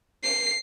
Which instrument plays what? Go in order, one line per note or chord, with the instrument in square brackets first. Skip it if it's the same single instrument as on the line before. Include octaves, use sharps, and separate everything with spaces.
[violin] C7